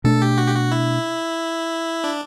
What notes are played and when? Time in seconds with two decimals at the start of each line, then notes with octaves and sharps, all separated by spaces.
0.04 B2 A3 D4 A4
0.22 G4
0.38 F#4
0.47 G4
0.55 F#4
0.71 E4
2.04 D4